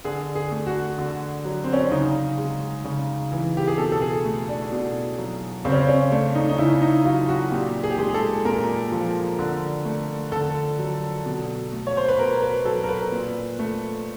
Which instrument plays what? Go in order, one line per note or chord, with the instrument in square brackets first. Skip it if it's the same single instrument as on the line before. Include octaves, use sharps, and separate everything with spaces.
[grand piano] D3 G#4
G#4
A3
F#4
D3
F#3
C4
C#4
D4
C#3 D#4
G#3
C#3
E3
G4
G#4
B2 A4
A4
G#4
A3
D4
B2
F#3
C#3 C4
C#4
C4
C#4
A3 D4
D#4
D#4
C#3 E4
D#4
F#3 F4
F#4
A#2 G4
G#4
G4
G#3 G#4
G#4
A4
A#2 A#4
F3
D3
A3
D3 A4
F#3
B2
A3
C#5
C5
B4
B2 A#4
B4
F#3 A4
A#4
B4
A#2
A3